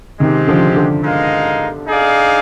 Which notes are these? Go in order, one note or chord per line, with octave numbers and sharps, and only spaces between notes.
C3 D#3 G#3 C4 G4
D3 F3
D3
G#3 D#4 A#4 F5
D#4 G#4 D5 F5